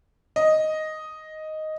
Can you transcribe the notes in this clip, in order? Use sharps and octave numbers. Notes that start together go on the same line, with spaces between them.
D#5